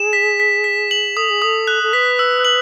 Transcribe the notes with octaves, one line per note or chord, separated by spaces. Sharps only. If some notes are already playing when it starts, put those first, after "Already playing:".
Already playing: G#4 E7
B6
B6
B6
F#7
A4 D#6
G#4
A4 D#6
F#6
A4
B4 B6
E6
F#7